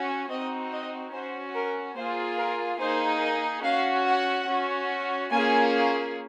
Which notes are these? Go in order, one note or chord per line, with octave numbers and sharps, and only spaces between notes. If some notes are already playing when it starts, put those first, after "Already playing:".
Already playing: C#4 F#4
C4 D#4 F#4 D#5
D#5
C#4 F#4 C5
A#4
A#3 F4 G#4 C5
A#4
A#3 D#4 G#4 C5
D#5
C#4 F#4 F5
F#5
C#4 F#4
A#3 C#4 F4 G#4 G#5